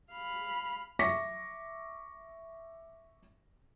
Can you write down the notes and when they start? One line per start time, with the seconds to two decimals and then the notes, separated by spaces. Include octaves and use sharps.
0.12 F5 B5
0.99 E5 C#6 D6 A#6 B6 C#7